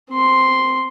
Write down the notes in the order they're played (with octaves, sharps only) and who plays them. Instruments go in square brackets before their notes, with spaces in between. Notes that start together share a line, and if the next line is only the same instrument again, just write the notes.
[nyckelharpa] C4 C6